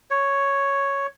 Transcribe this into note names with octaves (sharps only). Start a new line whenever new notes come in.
C#5